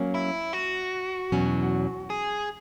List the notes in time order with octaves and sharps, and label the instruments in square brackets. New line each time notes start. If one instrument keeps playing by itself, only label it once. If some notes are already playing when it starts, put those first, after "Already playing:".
Already playing: [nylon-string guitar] F#3 A#3 C#4
[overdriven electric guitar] E4
F#4
[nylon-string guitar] E2 B2 F#3 C#4
[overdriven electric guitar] G#4